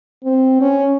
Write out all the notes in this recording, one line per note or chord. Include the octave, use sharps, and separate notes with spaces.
C4
C#4